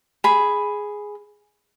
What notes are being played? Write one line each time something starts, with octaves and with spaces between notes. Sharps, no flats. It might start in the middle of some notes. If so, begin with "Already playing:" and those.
G#4 B5